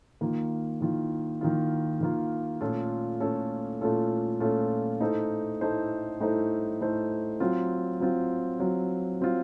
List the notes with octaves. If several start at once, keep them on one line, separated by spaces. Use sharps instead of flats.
D#3 A#3 F4
D#3 A#3 F4
D#3 A#3 F4
D#3 A#3 F4
A#2 A3 C#4 F4 A4
A#2 A3 C#4 F4 A4
A#2 A3 C#4 F4 A4
A#2 A3 C#4 F4 A4
A2 A3 D#4 A4 C5
A2 A3 D#4 A4 C5
A2 A3 D#4 A4 C5
A2 A3 D#4 A4 C5
F#3 C4 F4
F#3 C4 F4
F#3 C4 F4
F#3 C4 F4